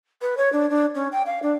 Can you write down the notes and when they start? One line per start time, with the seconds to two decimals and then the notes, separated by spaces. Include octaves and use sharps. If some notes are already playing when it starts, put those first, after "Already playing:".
0.21 B4
0.37 C#5
0.52 D4
0.70 D4
0.95 C#4
1.12 G5
1.26 F5
1.42 D4